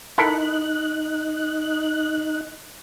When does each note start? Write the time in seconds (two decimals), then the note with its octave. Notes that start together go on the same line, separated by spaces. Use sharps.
0.18 D#4 E4 A4 A#4 F#6